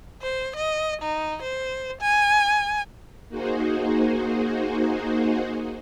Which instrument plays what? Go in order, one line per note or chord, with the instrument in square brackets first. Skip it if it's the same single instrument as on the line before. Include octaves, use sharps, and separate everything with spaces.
[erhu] C5
D#5
D#4
C5
G#5
[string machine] A#3 D#4 F#4 G#4 C5